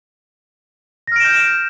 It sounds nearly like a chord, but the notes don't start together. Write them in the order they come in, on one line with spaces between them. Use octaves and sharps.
A#6 F6 D7 E7 G6